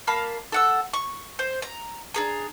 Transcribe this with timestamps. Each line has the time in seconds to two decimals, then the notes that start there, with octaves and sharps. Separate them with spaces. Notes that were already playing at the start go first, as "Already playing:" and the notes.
0.07 A#3 F5 A5 B5
0.52 A4 F#5 E6
0.94 C#6
1.39 C5
1.62 A#5
2.14 D4 G#4 A#5